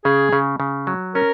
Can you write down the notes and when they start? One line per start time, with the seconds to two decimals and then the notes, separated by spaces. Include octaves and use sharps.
0.05 C#3 G#4
0.33 C#3
0.60 C#3
0.87 F#3
1.15 C#4 A#4